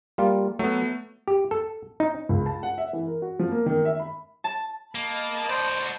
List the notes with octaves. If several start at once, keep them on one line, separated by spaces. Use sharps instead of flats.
G3 A#3 F4
F#3 A3 B3
G4
A4
D#4
C#2
A5
F#5
E5
E3
A#4
F#4
F3
A#3
D#3
E5
B5
A5
A#3 D#5 A5 B5
F#4 C5 D5